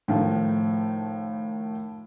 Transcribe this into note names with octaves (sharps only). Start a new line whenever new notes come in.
A2 D#3 F3 A3